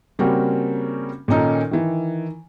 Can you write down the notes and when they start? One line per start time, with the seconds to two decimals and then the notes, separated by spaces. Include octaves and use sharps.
0.19 C#3 G3 A#3 C4 C#4 F#4
1.28 A#2 D#3 C#4 D#4 A4
1.71 D#3 E3